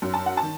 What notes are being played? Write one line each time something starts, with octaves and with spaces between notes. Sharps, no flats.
F#2
A5
F#5
A5
D#3